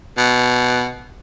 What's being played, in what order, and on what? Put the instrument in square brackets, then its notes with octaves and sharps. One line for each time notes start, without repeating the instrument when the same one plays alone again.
[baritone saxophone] B2